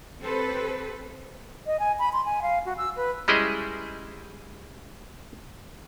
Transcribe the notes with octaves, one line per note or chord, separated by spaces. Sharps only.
C4 G4 A4 B4 C5
D#5
G#5
B5
C6
G#5
F5
F#4
E6
B4
G3 G#3 C#4 E4 G#4 D#5